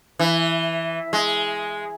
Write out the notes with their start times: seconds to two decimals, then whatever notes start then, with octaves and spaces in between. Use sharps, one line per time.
0.19 E3
1.13 G#3